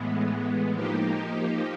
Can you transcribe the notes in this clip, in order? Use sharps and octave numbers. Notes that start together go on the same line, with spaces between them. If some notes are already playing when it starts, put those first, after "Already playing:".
Already playing: A2 E3 G#3 B3
F3 A#3 D#4 G4